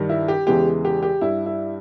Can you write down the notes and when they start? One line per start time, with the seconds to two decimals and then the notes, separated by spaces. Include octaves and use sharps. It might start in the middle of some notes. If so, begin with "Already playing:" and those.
Already playing: G2 D#3 G3
0.09 E4
0.28 G4
0.47 E2 C#3 E3 G#3 G4
0.85 G4
1.03 G4
1.21 G2 G3 E4
1.46 E4